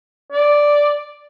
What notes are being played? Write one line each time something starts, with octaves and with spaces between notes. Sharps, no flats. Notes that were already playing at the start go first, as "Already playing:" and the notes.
D5